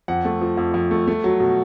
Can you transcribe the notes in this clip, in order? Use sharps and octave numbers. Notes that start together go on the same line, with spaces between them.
F2 F#5
A3
F3
F2
F2
A3
A3
F#3
B2